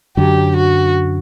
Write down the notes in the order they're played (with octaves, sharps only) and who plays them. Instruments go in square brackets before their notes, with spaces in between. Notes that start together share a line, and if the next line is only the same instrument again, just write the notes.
[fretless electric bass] F#2 D3 F#3 [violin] G4
[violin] F#4